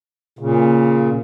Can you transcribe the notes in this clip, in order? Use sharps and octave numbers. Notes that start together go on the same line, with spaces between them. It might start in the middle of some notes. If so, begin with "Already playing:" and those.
A#2 C#3